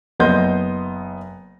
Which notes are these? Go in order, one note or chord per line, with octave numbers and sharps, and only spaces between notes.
F#1 B3 D#5 C6 G6